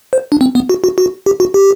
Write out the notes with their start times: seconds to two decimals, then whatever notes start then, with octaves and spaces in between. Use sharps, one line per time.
0.13 C5
0.32 D4
0.41 C4
0.55 B3
0.69 F#4
0.84 F#4
0.98 F#4
1.26 G4
1.40 F#4
1.54 G4